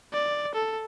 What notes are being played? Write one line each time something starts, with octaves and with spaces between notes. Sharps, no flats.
D5
A4